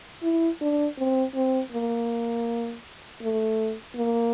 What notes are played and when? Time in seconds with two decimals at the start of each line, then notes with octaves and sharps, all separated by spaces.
0.23 E4
0.61 D4
0.98 C4
1.35 C4
1.72 A#3
3.22 A3
3.96 A#3